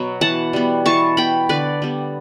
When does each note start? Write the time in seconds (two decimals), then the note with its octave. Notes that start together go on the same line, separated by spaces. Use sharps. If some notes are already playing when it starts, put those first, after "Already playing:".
Already playing: B2 F#3 B3
0.21 E3 F#5 A5
0.53 G3 B3
0.86 E3 A5 C#6
1.17 B3 G5 B5
1.49 D3 B4 D5
1.82 G3 B3